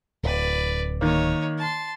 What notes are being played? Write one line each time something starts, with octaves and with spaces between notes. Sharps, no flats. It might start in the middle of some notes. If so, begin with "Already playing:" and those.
D1 B4 D5
D#3 A#3 D#4 C#5
A5 C6